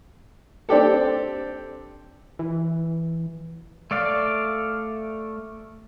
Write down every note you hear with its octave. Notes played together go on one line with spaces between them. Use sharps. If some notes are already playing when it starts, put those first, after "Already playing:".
C4 D4 G4 A4
E3
A3 D5 F5